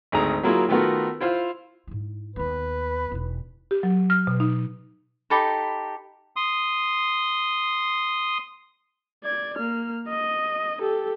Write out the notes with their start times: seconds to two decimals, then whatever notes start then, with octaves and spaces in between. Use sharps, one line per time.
0.12 G#1 D2 G#4 A#5
0.43 F#3 A#3 E4 F4 G#4
0.69 D#3 A3 B3 F4 F#4 A#4
1.21 E4 F4 C5 F5 F6
1.87 G#2 E4
2.36 D#2 B3 B4
3.12 E1 D#4
3.71 G4
3.83 F#3
4.10 F6
4.27 B2
4.40 D#4
5.30 D#4 G4 A4 B5
6.36 C6 D#6
9.24 D5 G#6
9.58 A#3 F6
10.09 D#5
10.81 G4 A4